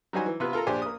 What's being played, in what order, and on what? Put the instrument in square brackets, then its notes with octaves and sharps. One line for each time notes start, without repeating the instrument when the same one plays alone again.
[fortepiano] F#3 G3 D#4 F#4 C5 G#5
E3
C3 B3 F4 B4
F4 A4 A#4 A#5
A#1 D4 G4 C5 G#5
A#3 D#6